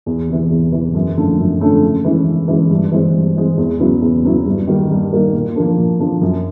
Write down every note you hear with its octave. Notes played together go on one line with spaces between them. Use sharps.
E2
C3 E3
E2
C3 E3
F#2
D3 F3 A3 C#4
F#2
D3 F3 A3 C#4
C#3
E3 G#3 C#4 E4
C#3
E3 G#3 C#4 E4
G2
E3 G#3 C4
G2
E3 G#3 C4
E2
C#3 F#3 B3 E4
E2
C#3 F#3 B3 E4
G2
D#3 G3 A#3 D#4
G2
D#3 G3 A#3 D#4
A#2
F3 A#3 D4
A#2
F3 A#3 D4
F#2